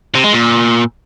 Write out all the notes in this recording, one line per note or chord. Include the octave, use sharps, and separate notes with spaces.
C3
G#3
A#2